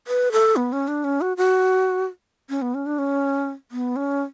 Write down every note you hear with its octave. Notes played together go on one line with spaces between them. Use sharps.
B4
A4
B3
C#4
D4
C#4
F#4
F#4
C#4
B3
C#4
D4
C#4
B3
C#4